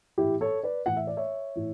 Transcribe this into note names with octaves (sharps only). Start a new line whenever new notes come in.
A2 E3 E4 G4
A4 C#5
B4 D5
A2 E3 F#5
E5
D5
C#5 E5
A2 E3